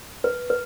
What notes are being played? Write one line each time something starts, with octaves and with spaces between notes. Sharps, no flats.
B4
B4